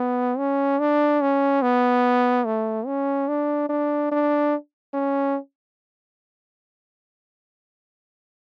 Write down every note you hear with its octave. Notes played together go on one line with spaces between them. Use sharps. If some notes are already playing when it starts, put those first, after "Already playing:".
Already playing: B3
C#4
D4
C#4
B3
A3
C#4
D4
D4
D4
C#4